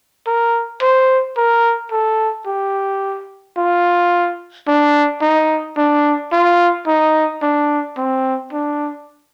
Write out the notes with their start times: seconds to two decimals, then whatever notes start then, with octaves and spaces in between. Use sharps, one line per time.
0.27 A#4
0.82 C5
1.37 A#4
1.92 A4
2.47 G4
3.57 F4
4.67 D4
5.22 D#4
5.77 D4
6.32 F4
6.87 D#4
7.42 D4
7.97 C4
8.52 D4